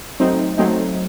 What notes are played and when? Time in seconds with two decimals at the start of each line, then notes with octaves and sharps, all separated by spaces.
0.20 F#3 A3 C4 D#4
0.58 F#3 A3 C4 D#4